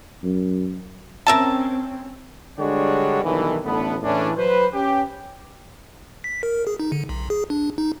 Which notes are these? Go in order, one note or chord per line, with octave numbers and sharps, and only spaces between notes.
F#2
C4 C#4 A#4 E5 A5
D3 G3 G#3 D4 F#4 C#5
B1 G2 D#3 E3
A1 D3 A3 B3
A2 C#3 E3 C#4 D4
F#3 B4 C5
C#4 G4
B6
A#4
G#4
D#4
D3
B1
G#4
D4
D#4